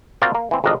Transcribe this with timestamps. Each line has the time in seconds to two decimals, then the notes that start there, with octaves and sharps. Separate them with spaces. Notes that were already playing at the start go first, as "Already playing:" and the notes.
0.22 A#3 C4 F4 F#4 D5
0.35 A#3
0.51 E3 C4
0.64 G#1 F2 D4 A#4 D#5